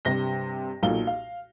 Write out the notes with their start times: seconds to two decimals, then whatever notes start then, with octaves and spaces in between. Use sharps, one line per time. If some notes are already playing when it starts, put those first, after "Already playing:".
0.05 G2 C3 A#6 G7
0.83 B1 A#2 A4 F5 G7
1.07 F5